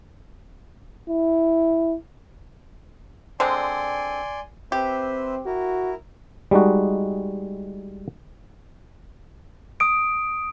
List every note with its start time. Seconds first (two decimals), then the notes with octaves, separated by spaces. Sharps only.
1.09 E4
3.40 D3 G#3 C4 D5 G#5 C6
4.72 C4 G4 B4 C5 E5
5.46 E4 F#4 A#4
6.51 G3 G#3 D#4 F#4
9.80 D#6 D7